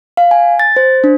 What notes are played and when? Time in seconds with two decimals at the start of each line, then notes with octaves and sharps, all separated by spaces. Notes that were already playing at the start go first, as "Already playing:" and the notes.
0.17 F5
0.31 G#5
0.59 A6
0.76 C5
1.04 D4